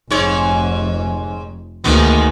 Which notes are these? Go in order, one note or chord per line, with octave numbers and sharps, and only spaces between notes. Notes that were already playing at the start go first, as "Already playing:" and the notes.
F1 G#2 C#5
D2 G#2 D#3 A#3 B3